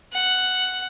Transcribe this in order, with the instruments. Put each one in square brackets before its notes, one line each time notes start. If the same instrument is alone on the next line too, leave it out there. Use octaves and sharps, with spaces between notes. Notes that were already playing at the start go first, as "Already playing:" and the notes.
[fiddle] F#5